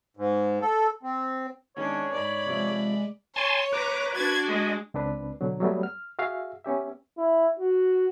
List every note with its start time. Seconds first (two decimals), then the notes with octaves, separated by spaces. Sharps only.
0.17 G#2
0.61 A4
1.03 C4
1.77 D#3 G#3 B3 C#4 D4 C#5
2.13 G#2 B4 D5 B5
2.46 C3 F3 G#3
3.36 C#5 G#5 A5 C6
3.73 B4 A#5 D6
4.15 D4 F#4 G#6 A6
4.48 G#3 D#5
4.94 C#2 C4 D4 B4
5.41 B2 D3 F#3
5.60 F#3 G3 A3 B3
5.83 F6
6.19 F#4 G#4 E5 F5
6.65 B3 C#4 G4 E5
7.18 E4
7.60 F#4